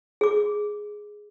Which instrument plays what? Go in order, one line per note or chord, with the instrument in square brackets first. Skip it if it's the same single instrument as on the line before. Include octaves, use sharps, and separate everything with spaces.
[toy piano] G#4 D6